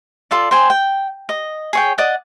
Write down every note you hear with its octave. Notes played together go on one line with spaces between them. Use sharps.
F4 A4 D5
C5 G5 G#5
G5
D#5
G#4 C#5 G5
D5 D#5 F#5 D#6